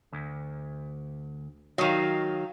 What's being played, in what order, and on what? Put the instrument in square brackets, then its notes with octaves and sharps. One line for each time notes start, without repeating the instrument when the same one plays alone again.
[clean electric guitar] D2
[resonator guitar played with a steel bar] D#3 F#3 [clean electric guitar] D#5 F5